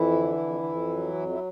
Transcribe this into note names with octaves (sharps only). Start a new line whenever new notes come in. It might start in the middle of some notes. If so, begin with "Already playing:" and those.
Already playing: F2 E3 E4
D3
F2
F2
F#3
F2
E4